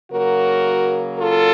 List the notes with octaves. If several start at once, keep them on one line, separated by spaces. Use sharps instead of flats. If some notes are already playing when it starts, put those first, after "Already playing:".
C#3 F#3 A#3 F#4 A#4
F4 A4